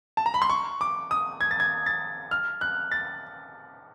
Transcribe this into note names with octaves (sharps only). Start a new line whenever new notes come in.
A5
A#5
B5
C6
C#6
D6
D#6
G#6
A6
G#6
A6
F6
F#6
A6